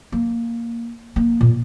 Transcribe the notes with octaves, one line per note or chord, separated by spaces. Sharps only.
A#3
A#3
A#2